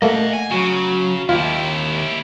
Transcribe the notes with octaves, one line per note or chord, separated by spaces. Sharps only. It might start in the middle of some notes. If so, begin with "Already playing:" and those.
A3 A#3 D#5 F#5
G#5
C#3 F#3 F#4
D#2 E4 F4 G4